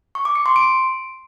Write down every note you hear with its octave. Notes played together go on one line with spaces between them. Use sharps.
C#6
D6
C#7
C6
D7